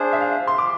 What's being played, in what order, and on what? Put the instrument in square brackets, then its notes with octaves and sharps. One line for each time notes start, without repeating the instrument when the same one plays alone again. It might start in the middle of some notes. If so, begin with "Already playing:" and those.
Already playing: [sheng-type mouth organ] D4 G#4 C5 [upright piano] E5
[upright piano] E5
F5
C6
D6